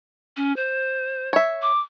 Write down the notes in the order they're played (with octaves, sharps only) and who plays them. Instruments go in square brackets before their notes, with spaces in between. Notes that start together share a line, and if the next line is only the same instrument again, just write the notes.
[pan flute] C#4
C5
[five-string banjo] C#5 E5
[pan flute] D6